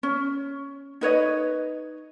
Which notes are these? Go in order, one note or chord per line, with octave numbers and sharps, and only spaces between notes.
C#4
D#4 B4 C#5 D#5